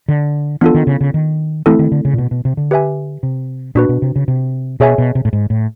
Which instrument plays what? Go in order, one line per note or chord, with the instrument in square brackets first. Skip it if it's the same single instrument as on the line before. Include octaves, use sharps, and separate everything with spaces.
[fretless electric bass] D3
[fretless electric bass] E3 [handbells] B3 D4 F4 A4
[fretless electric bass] D#3
C#3
C#3
D#3
[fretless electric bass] E3 [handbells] A3 C4 E4 A4
[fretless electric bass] D#3
D3
C#3
A#2
B2
B2
C3
D3
[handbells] G4 B4 E5 G#5
[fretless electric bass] C3
[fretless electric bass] A#2 [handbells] D4 F#4 B4
[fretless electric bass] B2
C3
C#3
C3
[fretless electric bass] B2 [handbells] G#4 C#5 E5 G#5
[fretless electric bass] B2
C3
A2
G#2
A2